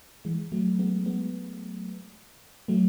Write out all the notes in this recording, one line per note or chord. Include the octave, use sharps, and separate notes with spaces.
E3 G#3
F#3 A3
G#3 B3
G#3 B3
F#3 A3